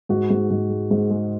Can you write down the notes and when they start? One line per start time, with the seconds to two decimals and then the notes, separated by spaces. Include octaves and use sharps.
0.09 G#2 F#4
0.30 G#2
0.51 G#2
0.70 G#3
0.91 G#2
1.10 G#3